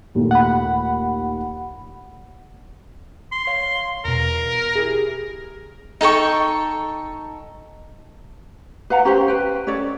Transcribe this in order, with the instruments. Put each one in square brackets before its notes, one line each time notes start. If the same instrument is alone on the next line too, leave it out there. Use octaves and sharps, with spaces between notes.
[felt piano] D#2 A#2 A3
[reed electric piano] F#5 B5
[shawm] C6
[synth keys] C#5 F5
[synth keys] E2 B2 [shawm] A#4
[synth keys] E4 G4 G#4
[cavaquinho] D#4 A4 G5 C#6
[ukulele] B4 F5 F#5 A#5
C#4 G4 A#4 C5
B4 G5
C#4 A4 C#5 D5